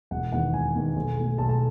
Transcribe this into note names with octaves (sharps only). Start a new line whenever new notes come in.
E1 F#5
E2 D#3 F#5
E1 G#5
E2 D#3
B1
B2 A3
B1 A5
A5